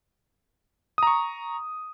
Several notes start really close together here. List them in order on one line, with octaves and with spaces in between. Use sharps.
D#6 A#5 C#6